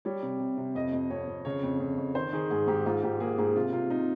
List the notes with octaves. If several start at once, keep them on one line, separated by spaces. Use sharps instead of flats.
G3 C#5
C3
C3
C3
F2 D#5
F2
F2 C#5
F2
C#3 C#5
F2
F2
F2
D#3 C5
D#3 G#4
G#2 G#4
G#2 G4
G#2 F4
G#2 G4
A#3 G#4
G#2 G#4
C3 F4
C3 F4
C3 D#4